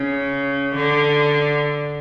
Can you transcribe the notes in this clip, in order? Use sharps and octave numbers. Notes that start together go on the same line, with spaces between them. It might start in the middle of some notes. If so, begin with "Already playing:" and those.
Already playing: C#3
D3